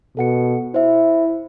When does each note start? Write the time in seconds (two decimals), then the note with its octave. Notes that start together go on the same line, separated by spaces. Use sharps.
0.17 B2 A4 F#5 C#7
0.74 E4 C5 E5